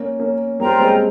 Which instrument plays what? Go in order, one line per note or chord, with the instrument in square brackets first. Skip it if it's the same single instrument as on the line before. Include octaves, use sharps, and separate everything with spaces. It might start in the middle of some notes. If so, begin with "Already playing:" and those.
Already playing: [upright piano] A#3 C#4
A#3 C#4
[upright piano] G3 A#3 [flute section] F4 C5 G5 A#5
[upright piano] G#3 C4